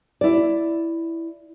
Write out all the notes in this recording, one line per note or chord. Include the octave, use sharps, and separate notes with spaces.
E4 D5